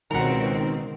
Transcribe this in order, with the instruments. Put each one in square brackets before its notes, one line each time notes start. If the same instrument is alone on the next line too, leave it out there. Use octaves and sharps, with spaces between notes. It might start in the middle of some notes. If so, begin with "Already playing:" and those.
[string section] C#2 B2 C4 [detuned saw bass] D#3 [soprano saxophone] A#4 [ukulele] F#5 A#5